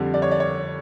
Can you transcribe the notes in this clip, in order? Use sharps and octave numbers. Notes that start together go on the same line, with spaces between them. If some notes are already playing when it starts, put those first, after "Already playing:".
Already playing: F2 D3 G3
D5
C#5
D5
C#5